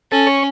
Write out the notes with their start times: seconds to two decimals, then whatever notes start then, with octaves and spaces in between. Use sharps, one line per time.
0.11 C#4 A4
0.27 C#5